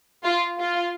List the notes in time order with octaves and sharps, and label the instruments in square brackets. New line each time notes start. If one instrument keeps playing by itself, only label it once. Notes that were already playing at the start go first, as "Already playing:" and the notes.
[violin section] F4
F4